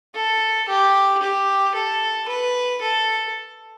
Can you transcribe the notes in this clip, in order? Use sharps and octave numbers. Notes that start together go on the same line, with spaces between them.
A4
G4
G4
A4
B4
A4